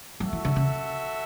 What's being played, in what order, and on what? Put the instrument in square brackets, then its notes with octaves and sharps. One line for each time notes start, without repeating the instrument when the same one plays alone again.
[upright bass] F#3 [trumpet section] F#4 A4 E5
[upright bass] E3
D3
C#3